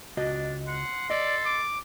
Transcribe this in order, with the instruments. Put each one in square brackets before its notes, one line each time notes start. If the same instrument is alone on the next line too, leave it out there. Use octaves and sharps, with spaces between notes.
[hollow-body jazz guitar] C#2 F#4 D#5 [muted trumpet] D4
[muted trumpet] F#5 [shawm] C6
[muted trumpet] A4 [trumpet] D5 [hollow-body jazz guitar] D#5
[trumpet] D6